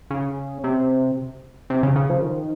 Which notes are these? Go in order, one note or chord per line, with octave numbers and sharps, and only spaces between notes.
C#3
C3
C3
C#3
C#3
F3
D#3